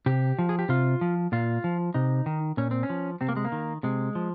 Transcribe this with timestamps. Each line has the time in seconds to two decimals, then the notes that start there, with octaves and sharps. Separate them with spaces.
0.06 C3 G4
0.39 F3
0.49 G#4
0.59 G4
0.69 C3 F4
1.01 F3
1.32 A#2 F4
1.64 F3
1.94 C3 D#4
2.26 D#3
2.57 A#2 C#4
2.71 C4
2.83 C#4
2.90 F3
3.21 C3 C4
3.29 A#3
3.36 G#3
3.45 A#3
3.52 D#3
3.83 C3 G#3
4.15 F3